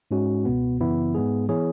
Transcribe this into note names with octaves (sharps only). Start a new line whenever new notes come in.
G#2 G#3 C#4 F#4
C#2 B2 B3
F#2 C#3 E3 B3 E4
G#2 G#3 B3 G#4
E3 B3 E4 G#4 C#5